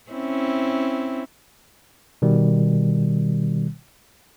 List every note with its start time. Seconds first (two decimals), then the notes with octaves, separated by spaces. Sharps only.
0.11 C4 C#4 E4
2.22 B2 D#3 G3